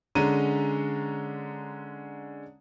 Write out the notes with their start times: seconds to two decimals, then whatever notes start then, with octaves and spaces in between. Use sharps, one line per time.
0.15 D3 G#3 C#4 A#5 D#7